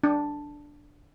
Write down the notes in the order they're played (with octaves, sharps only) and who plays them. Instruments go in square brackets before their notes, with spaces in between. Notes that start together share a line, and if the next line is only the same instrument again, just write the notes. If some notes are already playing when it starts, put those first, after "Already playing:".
[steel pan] D4